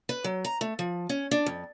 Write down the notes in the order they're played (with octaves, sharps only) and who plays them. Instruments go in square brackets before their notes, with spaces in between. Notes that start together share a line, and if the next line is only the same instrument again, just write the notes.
[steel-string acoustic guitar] B4
F#3
A#5
A3
F3
C#4
D4
F2